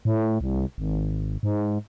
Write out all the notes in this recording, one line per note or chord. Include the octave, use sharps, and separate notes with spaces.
A2
C2
G#1
G#2